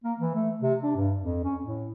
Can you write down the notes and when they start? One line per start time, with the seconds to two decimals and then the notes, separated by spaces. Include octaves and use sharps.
0.04 A#3
0.20 E3
0.35 A3
0.61 C3
0.83 D4
0.96 G2
1.22 F2
1.44 C#4
1.64 A2